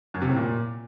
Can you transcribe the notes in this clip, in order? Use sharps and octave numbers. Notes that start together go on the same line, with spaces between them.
F#2
C3
A2
A#2